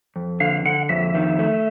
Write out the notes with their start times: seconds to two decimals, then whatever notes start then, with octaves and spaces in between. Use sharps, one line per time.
0.16 F2
0.40 D3 F5
0.65 D3 F#5
0.89 F2 E5
1.15 D#3
1.39 A3